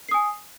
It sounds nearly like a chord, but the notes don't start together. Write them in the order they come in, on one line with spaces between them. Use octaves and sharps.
C7 D#6 G#5